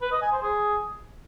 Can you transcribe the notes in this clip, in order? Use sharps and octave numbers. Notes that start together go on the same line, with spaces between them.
B4
D#5
G#5
C5
G#4